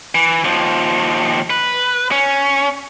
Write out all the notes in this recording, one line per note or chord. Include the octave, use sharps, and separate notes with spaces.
E3
D#2 F3
B4
C#4